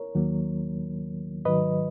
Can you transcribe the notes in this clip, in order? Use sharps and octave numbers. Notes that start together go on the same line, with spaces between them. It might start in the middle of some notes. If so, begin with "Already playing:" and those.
Already playing: A#4 C#5
D#2 D#3 F#3 A#3
G#2 D#3 F#3 B4 D#5